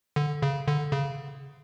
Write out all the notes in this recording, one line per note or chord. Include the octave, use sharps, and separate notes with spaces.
D3
C#3
D3
C#3